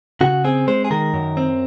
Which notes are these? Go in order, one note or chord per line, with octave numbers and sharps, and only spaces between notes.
C#3 F#4
C4 G#4
G#3 C5
G#4
D#3 A#4
F#2
C4